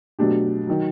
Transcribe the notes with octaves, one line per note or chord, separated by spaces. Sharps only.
B2 F#3 A3 D4 G4
D#3 F#3